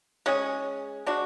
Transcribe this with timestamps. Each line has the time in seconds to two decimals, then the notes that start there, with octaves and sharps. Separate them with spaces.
0.26 G#3 C#4 G#4
1.06 G#3 D4 F#4